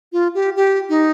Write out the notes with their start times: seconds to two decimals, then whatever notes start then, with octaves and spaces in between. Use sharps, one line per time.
0.12 F4
0.34 G4
0.56 G4
0.89 D#4